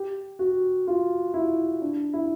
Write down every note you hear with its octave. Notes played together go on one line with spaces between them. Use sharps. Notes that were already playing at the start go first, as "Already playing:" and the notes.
Already playing: G4
F#4
F4
E4
D4
E4